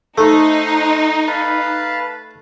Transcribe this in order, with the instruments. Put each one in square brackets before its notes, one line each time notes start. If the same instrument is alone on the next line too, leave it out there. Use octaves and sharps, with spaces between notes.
[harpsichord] A3 [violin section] D#4 [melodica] C5 F#5 D#6
[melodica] B4 F5 A5